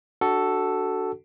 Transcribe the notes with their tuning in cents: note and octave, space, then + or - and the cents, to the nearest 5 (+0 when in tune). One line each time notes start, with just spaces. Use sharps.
D4 +0 F#4 +25 A4 +0